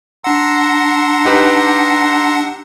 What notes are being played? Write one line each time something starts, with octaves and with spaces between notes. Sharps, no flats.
D4 F#5 A#5 C6 E6
D#4 G4 B4